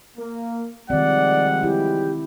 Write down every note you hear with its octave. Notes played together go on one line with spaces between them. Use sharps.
A#3
D#3 F3 G3 G#3 C4 D5 F#5
E4 G4